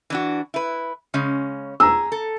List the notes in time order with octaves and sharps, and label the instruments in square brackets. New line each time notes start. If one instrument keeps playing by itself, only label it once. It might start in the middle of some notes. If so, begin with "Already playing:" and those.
[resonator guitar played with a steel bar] E3 D4 F#4
E4 B4
C#3 G#3 C#4
[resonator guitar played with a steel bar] G#4 [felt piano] A#5 E6
[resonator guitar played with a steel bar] A4